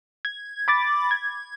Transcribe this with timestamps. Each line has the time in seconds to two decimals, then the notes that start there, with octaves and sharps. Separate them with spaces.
0.25 G#6
0.68 B5 D6 A6
1.11 G#6